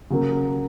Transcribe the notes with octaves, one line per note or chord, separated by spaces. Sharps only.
C#3 F#3 A#3